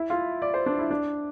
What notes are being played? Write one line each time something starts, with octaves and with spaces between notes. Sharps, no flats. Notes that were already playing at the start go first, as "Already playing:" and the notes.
Already playing: E4
F4
D5
C5
D4
E4
D4